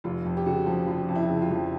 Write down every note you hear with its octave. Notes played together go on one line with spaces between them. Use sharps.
F1 F4
F2
G4
C#3 F#4
F3
F1 F4
F2
E4
C#3
F4
F3